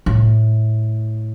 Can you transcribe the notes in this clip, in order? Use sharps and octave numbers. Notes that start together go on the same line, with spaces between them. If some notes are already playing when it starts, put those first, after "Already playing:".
A2